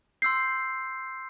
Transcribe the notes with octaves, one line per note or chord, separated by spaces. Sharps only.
C6 E6 G6 C7